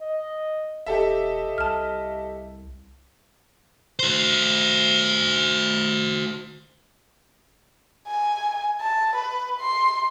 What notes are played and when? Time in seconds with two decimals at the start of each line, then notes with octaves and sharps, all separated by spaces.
0.01 D#5
0.86 E1 G4 A4 D#5 E5
1.58 C2 A5 F6
3.99 F#4 C5
8.08 G#5
8.81 A5
9.16 B4
9.60 C6